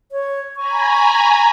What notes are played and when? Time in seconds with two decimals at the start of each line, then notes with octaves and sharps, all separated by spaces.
0.12 C#5
0.56 G#5 A#5 B5 C#6